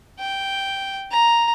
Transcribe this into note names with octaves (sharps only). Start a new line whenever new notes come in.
G5
A#5